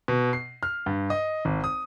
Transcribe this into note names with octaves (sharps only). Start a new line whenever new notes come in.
B2
C7
F6
G2
D#5
G#1
D#6